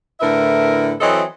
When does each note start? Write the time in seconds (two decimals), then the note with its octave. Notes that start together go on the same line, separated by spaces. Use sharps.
0.21 A2 D3 E4 A#4 B4 E5
1.00 E3 F#3 C4 A4 D#5